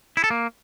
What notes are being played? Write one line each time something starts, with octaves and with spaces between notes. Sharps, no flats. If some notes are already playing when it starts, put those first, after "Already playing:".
E4
A4
A#3